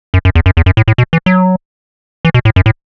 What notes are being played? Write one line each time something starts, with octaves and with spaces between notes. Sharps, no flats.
F#2
F#2
E2
F#2
E2
F#2
A2
A2
B2
E3
F#3
E3
B2
A2
F#2
A2